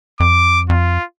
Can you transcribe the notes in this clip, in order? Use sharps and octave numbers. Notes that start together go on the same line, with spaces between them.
F2 D6
F2 F4